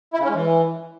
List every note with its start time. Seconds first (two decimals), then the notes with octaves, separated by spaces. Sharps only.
0.14 E4
0.19 C#3
0.24 C#4
0.29 G#3
0.35 E3